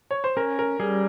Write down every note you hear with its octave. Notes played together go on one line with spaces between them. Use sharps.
C#5
C5
C#4 A#4
A#4
G3 G#4